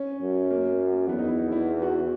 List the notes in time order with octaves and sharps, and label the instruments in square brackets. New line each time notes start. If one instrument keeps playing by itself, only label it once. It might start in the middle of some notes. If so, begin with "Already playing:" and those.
Already playing: [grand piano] C#4
[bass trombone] F#2
[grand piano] A#3
[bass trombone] E2 [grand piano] B3
[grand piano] D#4
E4
D#4
E4
F#4